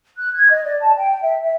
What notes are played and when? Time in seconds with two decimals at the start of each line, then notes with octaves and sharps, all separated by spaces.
0.18 F#6
0.34 G#6
0.50 D#5
0.64 D5
0.82 A5
0.97 G5
1.22 E5
1.44 E5